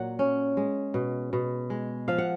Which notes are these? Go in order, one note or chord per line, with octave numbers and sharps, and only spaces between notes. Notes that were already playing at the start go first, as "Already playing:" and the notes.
Already playing: A#2 F#3 F#5
C#4
G#3
B2
B2
G#3
F3 F5
F#5